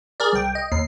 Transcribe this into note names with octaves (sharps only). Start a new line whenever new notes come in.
G#4 A#4 D5
C2 G5
D#5
D#2 C7